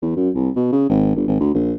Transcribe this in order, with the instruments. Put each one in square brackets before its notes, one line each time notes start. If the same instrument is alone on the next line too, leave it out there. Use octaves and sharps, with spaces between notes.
[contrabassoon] E2
F#2
C2
B2
C#3
G#1
G1
G#1
D2
A#1